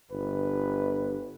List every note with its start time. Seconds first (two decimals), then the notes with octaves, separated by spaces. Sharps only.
0.11 G1 B4